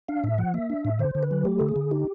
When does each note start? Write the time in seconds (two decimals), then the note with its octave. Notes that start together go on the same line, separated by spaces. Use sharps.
0.08 D4 F5
0.24 A2 E5
0.38 F3 F#5
0.54 A#3 E5
0.70 D4
0.85 A2
0.99 D3 C5
1.15 D3
1.23 B4
1.31 F#3
1.45 A3 G4
1.59 D3 A4
1.69 G#4
1.76 D3
1.91 D#4 G4